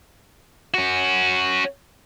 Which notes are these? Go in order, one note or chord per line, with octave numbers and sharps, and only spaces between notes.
C#4 F#4